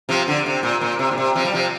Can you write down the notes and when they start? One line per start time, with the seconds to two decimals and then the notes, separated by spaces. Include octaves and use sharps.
0.09 C3 F3
0.28 D3
0.46 C3
0.63 A#2
0.81 A#2
0.99 C3
1.11 A#2
1.18 C3
1.35 C3 F3
1.45 G3
1.54 C3 F3